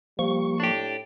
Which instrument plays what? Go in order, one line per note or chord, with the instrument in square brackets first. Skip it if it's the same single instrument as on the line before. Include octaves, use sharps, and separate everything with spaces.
[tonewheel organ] F3 A#3 C#6 [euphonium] G3
[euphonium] A2 [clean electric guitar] D4 G4